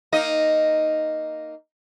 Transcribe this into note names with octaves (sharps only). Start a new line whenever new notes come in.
A#3 D#4 D#5